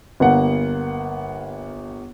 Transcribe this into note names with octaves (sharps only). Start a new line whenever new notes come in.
G1 A#3 F#5